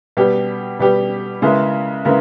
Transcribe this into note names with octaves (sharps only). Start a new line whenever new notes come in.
B2 G3 B3 G4
B2 G3 B3 G4
C#3 G#3 B3 E4 A#4
C#3 G#3 B3 E4 A#4